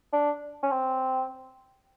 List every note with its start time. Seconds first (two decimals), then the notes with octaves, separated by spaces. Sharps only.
0.13 D4
0.63 C#4
0.71 C4